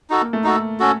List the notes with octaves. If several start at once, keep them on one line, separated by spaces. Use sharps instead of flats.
D#4 F#4 A4
A#3
A3
D#4 F#4 A4
C#4 F#4 A4